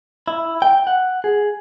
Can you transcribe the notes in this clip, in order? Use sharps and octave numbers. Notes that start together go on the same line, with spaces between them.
E4
G5
F#5
G#4